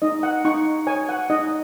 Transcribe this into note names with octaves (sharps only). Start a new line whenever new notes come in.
D#4 D#5
F#5
D#4 C#6
C#5 G#5
F#5
D#4 D#5